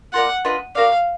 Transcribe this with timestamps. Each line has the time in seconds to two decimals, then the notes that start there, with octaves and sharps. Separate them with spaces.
0.13 F4 A#4 D5 F#5
0.45 D4 F4 B4 D#5
0.75 F#4 A#4 D5 F5